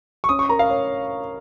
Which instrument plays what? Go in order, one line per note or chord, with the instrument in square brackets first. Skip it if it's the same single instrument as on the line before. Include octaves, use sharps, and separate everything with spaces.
[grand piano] C#6
[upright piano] C#4 [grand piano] D#6
[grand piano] C#6
[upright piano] A#4 [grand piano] A#5
[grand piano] F5
[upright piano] C#5